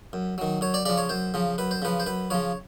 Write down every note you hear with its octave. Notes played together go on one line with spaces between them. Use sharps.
F#2
D#3 F#3
F#2 C#5
D5
C#3 F3 D5
C#5
F#2 C5
C#3 F3
F#2 B4
C5
C#3 F3 B4
C5
F#2 B4
C#3 F3 C#5